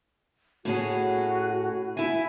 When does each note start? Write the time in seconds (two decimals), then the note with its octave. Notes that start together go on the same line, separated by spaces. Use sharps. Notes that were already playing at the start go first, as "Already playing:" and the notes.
0.65 A2 C#4 F#4 G#4
1.97 E4 E5 G#5